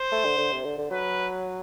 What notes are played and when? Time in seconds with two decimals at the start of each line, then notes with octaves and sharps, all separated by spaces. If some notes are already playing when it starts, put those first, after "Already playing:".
Already playing: C5
0.12 A3
0.25 D3
0.38 D3
0.52 C3
0.65 D3
0.78 D3
0.91 F#3 B4